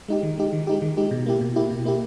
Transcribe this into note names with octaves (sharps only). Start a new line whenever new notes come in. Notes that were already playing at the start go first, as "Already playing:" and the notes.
G#3 D#4 G4
D#3
G#3 D#4 G4
D#3
G#3 D#4 G4
D#3
G#3 D#4 G4
B2
A#3 E4 G4
B2
A#3 E4 G4
B2
A#3 E4 G4